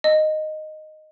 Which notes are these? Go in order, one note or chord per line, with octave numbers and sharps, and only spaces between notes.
D#5